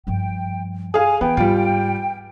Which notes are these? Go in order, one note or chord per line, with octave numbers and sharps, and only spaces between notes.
G2 F3 G5
G#4 F5 G#5
E3 B3 G5
G#2 G3 F4